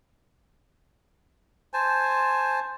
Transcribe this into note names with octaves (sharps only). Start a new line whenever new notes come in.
C5 G#5 A5